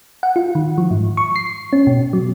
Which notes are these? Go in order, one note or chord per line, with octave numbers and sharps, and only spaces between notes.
F#5
F4
D#3
F3
G#2
C#6
C7
C#4
B2
F#3